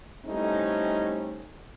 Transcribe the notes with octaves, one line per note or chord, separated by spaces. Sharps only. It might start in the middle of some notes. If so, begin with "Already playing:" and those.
G3 A3 C4 C#4 D#4 E4